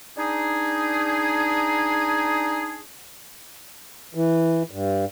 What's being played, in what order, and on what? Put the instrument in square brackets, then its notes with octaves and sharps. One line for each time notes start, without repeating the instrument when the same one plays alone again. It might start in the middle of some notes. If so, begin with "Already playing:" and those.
[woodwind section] D4 D#4 G#4
[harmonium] E3
G2